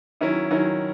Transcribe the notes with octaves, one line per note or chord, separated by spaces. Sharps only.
D#3 F#3 C#4 E4
D#3 F#3 C#4 E4